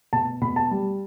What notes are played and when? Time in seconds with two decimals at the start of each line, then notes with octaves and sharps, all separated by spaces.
0.13 B2 A5
0.42 B2 B5
0.56 A5
0.71 G3